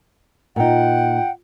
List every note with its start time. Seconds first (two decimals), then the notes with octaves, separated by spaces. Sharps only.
0.56 A#2 D#4 F#5 G5